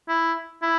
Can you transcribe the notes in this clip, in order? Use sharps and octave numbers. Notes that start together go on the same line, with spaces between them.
E4
E4